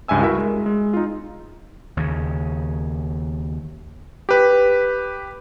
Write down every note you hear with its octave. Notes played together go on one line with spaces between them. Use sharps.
C#2 G2 E5 G#5 E6
E4 F#4 A#4 E5
G#3
G#3
D#4 F4
D#2 C#3
G4 B4